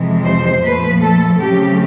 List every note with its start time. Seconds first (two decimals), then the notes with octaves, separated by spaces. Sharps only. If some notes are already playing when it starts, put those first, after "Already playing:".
Already playing: F2 C3 E3 G#3
0.24 C5
0.63 A#2 F3 A3 B4
1.01 A4
1.40 C#3 F#3 A3 C4 G4